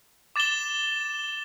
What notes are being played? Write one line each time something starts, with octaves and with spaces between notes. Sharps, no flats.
D6 A6 E7 G7